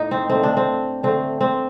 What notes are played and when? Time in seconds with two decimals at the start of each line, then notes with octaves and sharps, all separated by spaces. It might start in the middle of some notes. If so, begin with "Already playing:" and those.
Already playing: A2 A#3 D#4
0.11 C4
0.30 D3 A3 C4
0.43 D4
0.57 C4
1.03 D3 A3 C4
1.41 C4